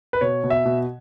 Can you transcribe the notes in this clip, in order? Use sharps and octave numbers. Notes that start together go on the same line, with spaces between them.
B4
B2 C#5
B2
E5
B2